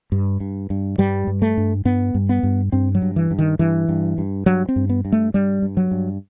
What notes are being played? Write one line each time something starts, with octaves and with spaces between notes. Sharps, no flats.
G2
G2
G2
G2 G3
G2
A3
G2
G2 B3
G2
B3
G2
G2 C4
F#3
G2
E3
G2
D#3
G2 E3
G2
G2
G2 F#3
C4
G2
B3
G2
A3
G2 G3
G2
F#3
G2